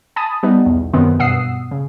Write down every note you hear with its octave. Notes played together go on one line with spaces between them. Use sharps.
G#5 A5 B5 D#6
G3 B3 D#4
B1 E2
F#2 C3 D#3 B3 C4
G2 B2 F#5 D#6 E6 C7
C#3